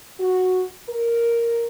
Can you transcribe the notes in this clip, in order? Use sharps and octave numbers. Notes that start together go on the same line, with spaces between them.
F#4
A#4